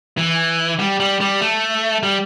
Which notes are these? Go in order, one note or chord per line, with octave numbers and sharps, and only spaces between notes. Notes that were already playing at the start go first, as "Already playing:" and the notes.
E3
G3
G3
G3
A3
G3